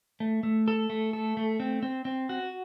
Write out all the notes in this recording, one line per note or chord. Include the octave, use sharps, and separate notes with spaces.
A3
A3
A4
A3
A4
A3
C4
C4
C4
F#4